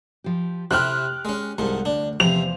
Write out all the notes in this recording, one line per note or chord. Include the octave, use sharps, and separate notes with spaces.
F3 G4
C3 C4 E4 G4 F6 F#6
G#3 C#4
C2 G#2 F3 F#5
D2 D4
E2 C3 F3 C5 F7